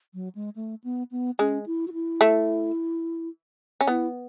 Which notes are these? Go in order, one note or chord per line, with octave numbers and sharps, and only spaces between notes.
F#3
G#3
A3
B3
B3
G#3 C#4
E4
F#4
E4
A3
C#4
B3 E4